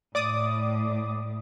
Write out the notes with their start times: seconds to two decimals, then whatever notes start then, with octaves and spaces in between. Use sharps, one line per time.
0.15 A2 D5 D6 D#6